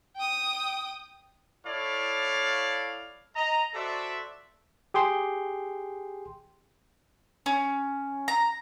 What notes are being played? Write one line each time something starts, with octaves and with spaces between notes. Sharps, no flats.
G5 D#6
E4 A4 C#5 D5 F5
D#5 A#5
F#4 A4 C5 D5 E5
G4 G#4 G5 C6
C#4
A#5